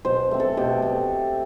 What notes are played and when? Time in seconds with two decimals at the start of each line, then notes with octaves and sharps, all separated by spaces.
0.05 B2 C5
0.31 A3 C4
0.40 A4
0.57 B2 G4
0.82 A3 C4